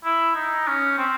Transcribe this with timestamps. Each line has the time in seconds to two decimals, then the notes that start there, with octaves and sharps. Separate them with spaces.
0.05 E4
0.35 D#4
0.67 C#4
0.98 C4